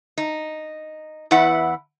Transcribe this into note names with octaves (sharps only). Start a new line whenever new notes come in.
D#4
E2 E4 B4 F#5